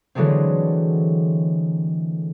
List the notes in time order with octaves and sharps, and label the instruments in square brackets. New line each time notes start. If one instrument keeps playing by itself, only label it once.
[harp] D3 E3 F#3 G#3 A3 C4